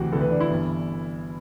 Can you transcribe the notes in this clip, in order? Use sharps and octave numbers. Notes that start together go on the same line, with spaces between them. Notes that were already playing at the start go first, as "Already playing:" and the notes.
Already playing: D2 C3 E3 F#4
D2 C3 E3 A4
B4
D4
E4
G1 G2 E3